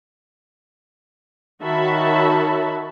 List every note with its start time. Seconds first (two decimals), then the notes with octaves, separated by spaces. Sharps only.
1.64 D#3 F#4 C#5 E5 A5 B5